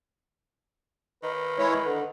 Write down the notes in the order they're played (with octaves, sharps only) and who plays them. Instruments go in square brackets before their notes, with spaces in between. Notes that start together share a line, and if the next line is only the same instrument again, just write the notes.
[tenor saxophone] D#3 [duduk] B4
[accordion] G#3 E4 C#5
D3